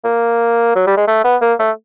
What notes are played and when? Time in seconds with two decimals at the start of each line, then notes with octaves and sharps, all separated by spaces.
0.05 A#3
0.76 F#3
0.87 G3
0.97 G#3
1.08 A3
1.24 B3
1.42 A#3
1.59 A3